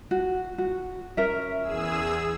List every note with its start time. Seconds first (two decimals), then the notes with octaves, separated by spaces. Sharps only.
0.11 F#4
0.58 F#4
1.17 C#4 A#4 E5
1.62 E2 G#4 E6